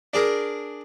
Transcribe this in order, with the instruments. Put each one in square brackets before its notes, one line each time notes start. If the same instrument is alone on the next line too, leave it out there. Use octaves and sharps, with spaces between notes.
[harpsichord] D4 G#4 A#4